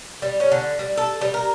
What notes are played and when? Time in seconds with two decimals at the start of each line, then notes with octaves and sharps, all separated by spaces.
0.22 G3
0.40 C#4
0.52 D3
0.79 G3
0.98 A4
1.21 G3
1.34 A#4